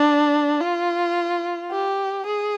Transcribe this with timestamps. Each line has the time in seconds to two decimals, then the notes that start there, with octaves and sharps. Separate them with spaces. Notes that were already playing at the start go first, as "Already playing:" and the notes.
Already playing: D4
0.61 F4
1.71 G4
2.26 G#4